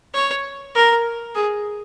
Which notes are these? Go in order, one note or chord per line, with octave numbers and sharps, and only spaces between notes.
C#5
A#4
G#4